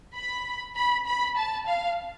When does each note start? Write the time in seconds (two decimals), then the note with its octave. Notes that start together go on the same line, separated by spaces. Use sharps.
0.14 B5
0.75 B5
1.05 B5
1.35 A5
1.66 F5